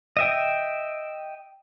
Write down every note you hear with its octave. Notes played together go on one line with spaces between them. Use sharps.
D#5 E5 G5